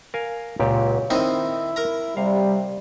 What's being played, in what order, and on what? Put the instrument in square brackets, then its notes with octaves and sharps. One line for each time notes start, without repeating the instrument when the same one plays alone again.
[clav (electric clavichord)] A#4 F5 G#5
[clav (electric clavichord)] C#2 A#2 G4 [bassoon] F#3
[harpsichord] D#3 C4 D#4 [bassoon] E4 [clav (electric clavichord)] C5 D#5
[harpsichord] A#4 A#5
[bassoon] C3 [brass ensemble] G3 [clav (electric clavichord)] F5